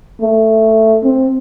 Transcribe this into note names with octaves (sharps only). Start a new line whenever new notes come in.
A3
C4